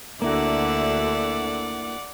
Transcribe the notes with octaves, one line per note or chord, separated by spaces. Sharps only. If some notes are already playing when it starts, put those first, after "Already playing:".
D2 D3 A#3 E4 F#4 D5 E5 F#5